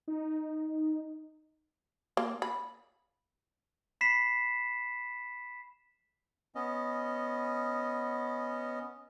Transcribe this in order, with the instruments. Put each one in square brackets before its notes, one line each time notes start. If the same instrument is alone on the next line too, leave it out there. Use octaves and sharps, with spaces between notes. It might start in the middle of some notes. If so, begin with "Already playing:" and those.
[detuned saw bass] D#4
[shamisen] A#3
B5
[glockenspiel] B5 B6 C7 E7
[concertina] B3 C#4 D#5